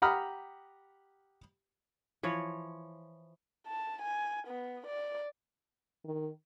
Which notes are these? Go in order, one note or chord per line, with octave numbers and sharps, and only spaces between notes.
G4 F#5 A#5 B5 D#6 F6
E3 F3 C#5
A5
G#5
B3
D5
D#3